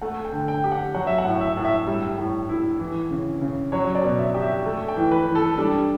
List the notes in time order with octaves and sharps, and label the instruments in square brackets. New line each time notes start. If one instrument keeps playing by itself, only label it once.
[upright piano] A3 [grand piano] F#5
[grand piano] G5
[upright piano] D3
[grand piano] G5
[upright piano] G4
[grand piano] F#5
[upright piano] F#3 [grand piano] F#5
[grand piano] E5
F#5
[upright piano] A2
[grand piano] E5
[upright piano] A2
[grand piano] E5
[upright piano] G3
A2
E4
E3
C#3
C#3
[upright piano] F#3 [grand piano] C#5
[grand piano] D5
[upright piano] B2
[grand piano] E5
[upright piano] G4
[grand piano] E5
[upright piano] A3
[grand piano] G5
[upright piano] E3
[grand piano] B4
[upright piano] E3
[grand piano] A4
[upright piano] G3 [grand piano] D4